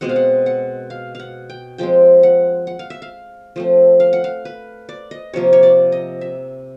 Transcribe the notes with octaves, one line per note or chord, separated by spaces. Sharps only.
B2 G#3 C4 F#5
F5
F#5
F#5
F5
F5 F#5
G5
F3 G#3 C4 G5
F#5
F#5
F5
E5
F5
F3 A3 C4
F5
F#5
F5
B4
D5
D#5
C3 F3 A#3 C#5
C#5
D5
D#5
E5